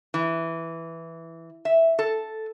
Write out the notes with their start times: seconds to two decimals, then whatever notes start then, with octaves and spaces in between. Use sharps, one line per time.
0.14 E3
1.65 E5
1.99 A4